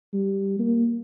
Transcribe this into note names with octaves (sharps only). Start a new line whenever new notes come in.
G3
A#3